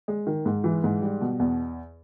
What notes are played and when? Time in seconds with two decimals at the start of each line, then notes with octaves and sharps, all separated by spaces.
0.08 G#3
0.27 D#3
0.46 G#2
0.64 E3
0.84 G#2
1.01 G3
1.21 B2
1.40 E2